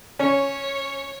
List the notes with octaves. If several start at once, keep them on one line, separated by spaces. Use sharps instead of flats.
C#4 C#5